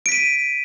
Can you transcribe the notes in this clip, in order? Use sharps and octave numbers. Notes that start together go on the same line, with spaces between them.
B6 D7 D#7